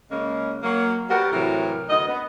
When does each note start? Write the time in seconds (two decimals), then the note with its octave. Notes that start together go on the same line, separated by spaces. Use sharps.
0.10 C#3 G#3 A#3 C#4
0.63 F#3 A#3
1.10 G3 B3 F#4 G4 A#4
1.32 A2 C3 E3 F#3 A#4
1.89 D2 B3 D#5
2.09 B3